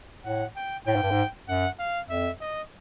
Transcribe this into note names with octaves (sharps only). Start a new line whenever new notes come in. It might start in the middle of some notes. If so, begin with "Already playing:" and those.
A2 F#5
G5
A2 G5
G#2
G2
G#2
F#2 F#5
F5
F2 E5
D#5